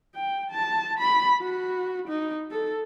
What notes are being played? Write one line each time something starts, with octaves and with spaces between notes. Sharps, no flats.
G5
A5
B5
F#4
D#4
A4